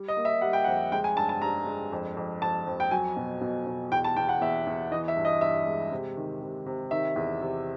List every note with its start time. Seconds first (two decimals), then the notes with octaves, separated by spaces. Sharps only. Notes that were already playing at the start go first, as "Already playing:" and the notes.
Already playing: G3
0.08 D#5
0.17 A#3
0.25 E5
0.41 G3 F#5
0.53 G5
0.64 F2 F#5
0.92 G#3 G5
1.04 G#5
1.16 G2 A5
1.29 A5
1.42 G2 A#5
1.66 G#3
1.92 F2
2.17 F2
2.41 F2 A5
2.66 F2
2.80 G5
2.91 F#3 G#5
3.16 B2
3.41 B2
3.66 B2
3.91 E2 G5
4.04 A5
4.16 E2 G5
4.29 F#5
4.41 E2 E5
4.67 E2
4.91 E3 D#5
5.08 E5
5.17 G2
5.25 D#5
5.41 G2 E5
5.66 G#3
5.91 C3
6.17 D#3
6.41 C3
6.66 C3
6.91 D#3 E5
7.16 E2
7.41 C3